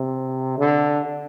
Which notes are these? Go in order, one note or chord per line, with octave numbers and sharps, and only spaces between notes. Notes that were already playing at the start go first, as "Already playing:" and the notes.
Already playing: C3
D3